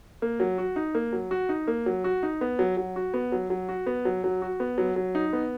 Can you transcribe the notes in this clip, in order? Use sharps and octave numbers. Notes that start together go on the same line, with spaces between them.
A#3
F#3
F#4
D#4
A#3
F#3
F#4
D#4
A#3
F#3
F#4
D#4
B3
F#3
F#3
F#4
B3
F#3
F#3
F#4
B3
F#3
F#3
F#4
B3
F#3
F#3
D#4
B3